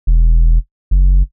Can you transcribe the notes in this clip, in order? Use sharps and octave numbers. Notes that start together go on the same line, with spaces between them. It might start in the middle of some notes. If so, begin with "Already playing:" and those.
E1
F#1